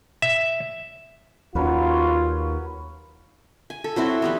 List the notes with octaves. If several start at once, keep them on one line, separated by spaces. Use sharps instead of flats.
E5
D#2 F#3 C#4 F4 B4
G#5
A4
F#3 C4 E4 F#4
E3 G3 B3